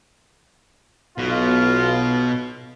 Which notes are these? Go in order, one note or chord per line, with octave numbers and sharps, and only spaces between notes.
B1 B2 F4